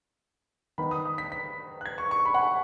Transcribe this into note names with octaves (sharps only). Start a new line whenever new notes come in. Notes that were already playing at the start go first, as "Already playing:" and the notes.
D#3 B3 D#4 B5
D#6
D#6
B6
B6
F#6
G#6
C#6
C#6
B5
F#5
G#5